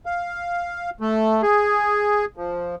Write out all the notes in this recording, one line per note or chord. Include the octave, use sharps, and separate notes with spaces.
F5
A3
G#4
F3